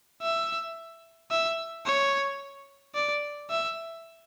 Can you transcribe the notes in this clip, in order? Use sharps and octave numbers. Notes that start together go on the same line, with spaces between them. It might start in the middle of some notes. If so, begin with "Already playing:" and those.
E5
E5
C#5
D5
E5